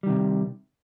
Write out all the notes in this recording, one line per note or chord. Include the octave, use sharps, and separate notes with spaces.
C3 D#3 G3